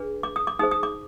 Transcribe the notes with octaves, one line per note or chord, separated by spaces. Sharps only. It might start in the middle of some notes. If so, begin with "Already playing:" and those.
Already playing: D4 G#4 B4
D6
D#6
D6
D#4 G#4 C5 D#6
D#6
D6